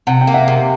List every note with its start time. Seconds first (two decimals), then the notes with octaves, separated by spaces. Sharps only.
0.07 C3 F#5
0.21 G5
0.27 A#3
0.34 E5 F#5
0.48 C3